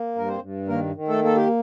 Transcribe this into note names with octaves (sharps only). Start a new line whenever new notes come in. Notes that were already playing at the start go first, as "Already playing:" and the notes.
Already playing: A#3
G2 A#4
C4 C5
G2
D#3 A#3 A#4
D#3
A3 A4
A#3 A4
G4